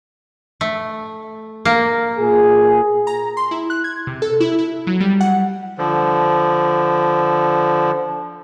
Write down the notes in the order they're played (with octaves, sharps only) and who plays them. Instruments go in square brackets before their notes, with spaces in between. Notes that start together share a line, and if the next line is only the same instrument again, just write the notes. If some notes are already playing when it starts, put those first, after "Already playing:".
[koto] A3
A#3
[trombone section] A#2 G#4
[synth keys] A#5
C6
E4
F#6
G#6
C3
A4
E4
E4
F#3
G3
F#5
[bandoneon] D3 F3